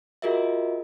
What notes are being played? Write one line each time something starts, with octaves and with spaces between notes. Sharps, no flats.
F4 F#4 G#4 A#4 D#5 E5